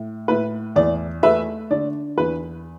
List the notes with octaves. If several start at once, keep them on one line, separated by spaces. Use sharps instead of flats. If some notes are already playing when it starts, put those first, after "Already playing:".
Already playing: A2
A2 B4
E2 D5
A3 B4 E5
D3 D5
E2 B4